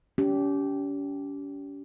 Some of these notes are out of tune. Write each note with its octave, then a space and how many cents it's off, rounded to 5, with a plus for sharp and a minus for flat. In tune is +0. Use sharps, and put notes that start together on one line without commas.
C#4 +40 G4 -15